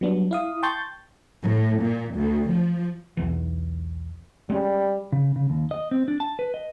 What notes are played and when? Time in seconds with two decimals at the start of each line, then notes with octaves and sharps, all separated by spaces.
0.01 F#3 G3 B3 D4
0.31 E4 F5 D#6
0.63 G5 A5 C6 C#6 G6 A6
1.43 A2
1.81 A#2
2.16 D2
2.49 F3
3.17 B1 E2 E3
4.50 G3 G#3 C#4
5.13 C#3
5.36 C#3
5.50 D#2
5.71 D#5
5.91 C4
6.08 D4
6.20 A5
6.39 B4
6.54 D#5